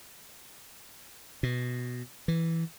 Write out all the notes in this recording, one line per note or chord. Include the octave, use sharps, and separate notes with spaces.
B2
E3